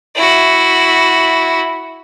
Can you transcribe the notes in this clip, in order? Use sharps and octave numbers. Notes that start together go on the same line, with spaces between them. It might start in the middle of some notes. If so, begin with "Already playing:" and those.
E4 F#4